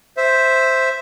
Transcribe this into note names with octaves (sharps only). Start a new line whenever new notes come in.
C5 E5